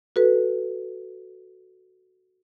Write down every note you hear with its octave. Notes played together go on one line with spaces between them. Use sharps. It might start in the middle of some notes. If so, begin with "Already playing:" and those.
F#4 A4 B4